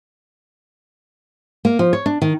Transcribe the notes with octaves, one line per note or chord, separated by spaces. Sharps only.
A#3
F3
C#5
D4
D#3